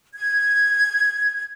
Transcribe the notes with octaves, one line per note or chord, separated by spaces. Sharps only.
G#6